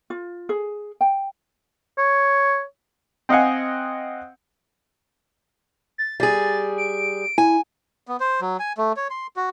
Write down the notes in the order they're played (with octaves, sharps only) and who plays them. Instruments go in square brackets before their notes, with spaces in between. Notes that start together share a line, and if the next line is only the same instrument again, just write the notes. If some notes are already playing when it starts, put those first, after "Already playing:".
[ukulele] F4
G#4
G5
[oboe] C#5
[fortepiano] C4 D#5 F5 F#5 G#5
[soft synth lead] A6
[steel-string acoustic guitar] G3 G#4 [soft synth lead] A6
[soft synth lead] D7
[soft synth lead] E4 [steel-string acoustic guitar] G#5
[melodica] B3
C5
F#3
G#5
A3
C#5
C6
F#4